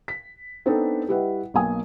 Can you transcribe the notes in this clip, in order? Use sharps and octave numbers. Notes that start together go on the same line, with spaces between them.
B6
B3 C4 D4 D#4 A4
G3 E4 B4 D#5 F#5
B1 A#3 G#5 D#6